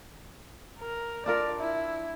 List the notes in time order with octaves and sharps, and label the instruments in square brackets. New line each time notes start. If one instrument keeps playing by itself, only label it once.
[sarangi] A#4
[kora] D4 F4 A#4 [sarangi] D5
[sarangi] E4